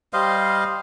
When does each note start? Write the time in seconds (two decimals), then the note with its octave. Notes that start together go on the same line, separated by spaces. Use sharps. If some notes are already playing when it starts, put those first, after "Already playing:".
0.13 G3 C5 D#5 F5